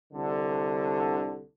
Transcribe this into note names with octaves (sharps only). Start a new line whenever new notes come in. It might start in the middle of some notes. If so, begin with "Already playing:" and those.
C2 D3